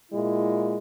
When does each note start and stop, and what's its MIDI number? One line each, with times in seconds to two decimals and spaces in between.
0.11 0.77 46
0.11 0.77 56
0.11 0.77 64